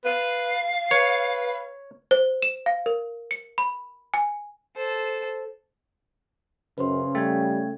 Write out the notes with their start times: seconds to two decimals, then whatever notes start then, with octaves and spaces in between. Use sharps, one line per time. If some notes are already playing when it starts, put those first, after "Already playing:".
0.04 B4 F5
0.91 B4 C#5
2.11 C5
2.42 E7
2.66 F5
2.86 A#4
3.31 C#7
3.58 B5
4.14 G#5
4.76 A4 C5
6.78 F#2 C#3 B4 C5 C6
7.15 G3 A3 G5 G#6